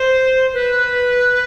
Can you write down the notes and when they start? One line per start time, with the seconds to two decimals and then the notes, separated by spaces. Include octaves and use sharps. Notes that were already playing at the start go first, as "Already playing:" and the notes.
Already playing: C5
0.54 B4